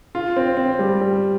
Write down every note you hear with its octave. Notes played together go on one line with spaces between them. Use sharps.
F4
C4
C4
G3
G3